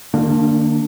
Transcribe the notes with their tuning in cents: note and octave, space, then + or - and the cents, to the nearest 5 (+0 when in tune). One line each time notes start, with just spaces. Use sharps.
D#3 -45 A#3 -20 D4 +0